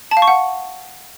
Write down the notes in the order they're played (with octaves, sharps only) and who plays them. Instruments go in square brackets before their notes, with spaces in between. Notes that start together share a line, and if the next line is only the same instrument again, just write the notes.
[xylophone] A5
F5
C#6
F#5